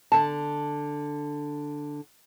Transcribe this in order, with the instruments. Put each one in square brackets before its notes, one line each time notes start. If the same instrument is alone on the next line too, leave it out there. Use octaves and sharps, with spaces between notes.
[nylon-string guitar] D3 A5